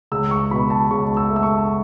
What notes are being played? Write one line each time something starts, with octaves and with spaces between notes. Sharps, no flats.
C#2 E6
C#6
B2 B5
A5
C#2 C#6
E6
A3
E6
C#6